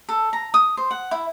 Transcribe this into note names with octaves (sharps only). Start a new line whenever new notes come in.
A4
A#5
D#6
C5
F#5
E4